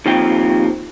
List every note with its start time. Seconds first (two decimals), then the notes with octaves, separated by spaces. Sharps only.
0.06 D#2 F3 C4 G5